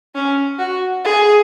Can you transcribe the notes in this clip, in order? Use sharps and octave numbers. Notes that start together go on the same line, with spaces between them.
C#4
F#4
G#4